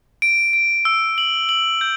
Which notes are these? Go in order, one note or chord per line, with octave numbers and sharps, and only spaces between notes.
D7
D7
E6
F#7
F#7
G6